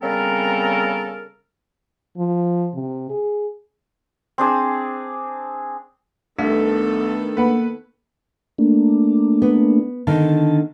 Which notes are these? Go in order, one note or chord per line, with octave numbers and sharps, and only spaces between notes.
C#3 G3 B3 C4 A4 A#4
F3
C3
G#4
C4 D4 G#4 C5
C2 D#3 A3 B3 D4 A4
A#3 B4 F#5 B5
A3 A#3 D4
B3
D3 D#3 A5